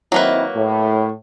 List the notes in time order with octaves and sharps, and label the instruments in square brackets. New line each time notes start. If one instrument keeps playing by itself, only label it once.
[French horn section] D#3 C4 E4 [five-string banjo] F#3 A#3 B4
[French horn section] A2